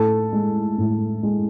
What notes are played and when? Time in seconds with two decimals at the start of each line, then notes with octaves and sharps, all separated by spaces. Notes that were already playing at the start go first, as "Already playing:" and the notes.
Already playing: A2 A4
0.32 G#3
0.78 A2
1.23 G#3